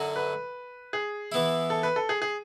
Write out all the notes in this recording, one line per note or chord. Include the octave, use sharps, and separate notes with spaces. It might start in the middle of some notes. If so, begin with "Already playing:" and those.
Already playing: F#2 D3 F#3 C#4 F#4
B4
G#4
E3 B3 E4
A4
B4
A4
G#4
G#4